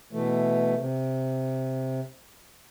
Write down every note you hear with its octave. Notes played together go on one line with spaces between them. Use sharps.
B2 E3 A3
C3